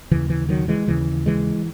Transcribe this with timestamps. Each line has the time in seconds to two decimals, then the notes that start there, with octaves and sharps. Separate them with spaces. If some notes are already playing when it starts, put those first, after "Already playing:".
0.11 D#2 C#3 E3
0.30 E3
0.49 D#3 F#3
0.68 E3 G#3
0.88 D#2 C#3 E3
1.26 E3 G#3